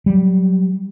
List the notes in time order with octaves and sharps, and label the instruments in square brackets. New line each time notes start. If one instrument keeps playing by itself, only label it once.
[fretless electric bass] F#3 G3